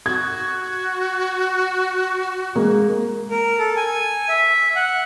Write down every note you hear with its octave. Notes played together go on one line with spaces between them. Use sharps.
F#4 G#6
G#3 A#3
A#4
A4
G#5
E5
F#5